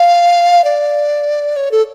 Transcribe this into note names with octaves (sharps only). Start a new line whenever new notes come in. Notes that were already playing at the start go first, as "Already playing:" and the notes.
Already playing: F5
D5
C#5
A4